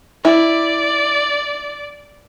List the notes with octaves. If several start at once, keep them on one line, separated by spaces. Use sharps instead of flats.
E4 D5